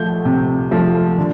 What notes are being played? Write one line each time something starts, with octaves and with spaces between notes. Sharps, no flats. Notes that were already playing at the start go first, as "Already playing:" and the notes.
Already playing: F3 A3 G6
C3
F3 A3
D3